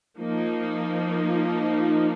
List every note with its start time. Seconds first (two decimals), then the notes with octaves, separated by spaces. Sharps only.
0.18 F3 A#3 D#4